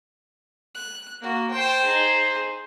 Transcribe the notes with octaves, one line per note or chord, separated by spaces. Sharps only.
F#6
A#3 F#4
C5 G5 A5
D#4 G#4